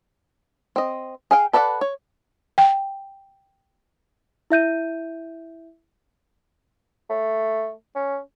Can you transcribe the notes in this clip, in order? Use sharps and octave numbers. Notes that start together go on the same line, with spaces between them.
C4 D#5
G#4 F5 G5
A4 B4 D5 E5 F#5
C#5
G5
E4 E5 G6 D#7
A3
C#4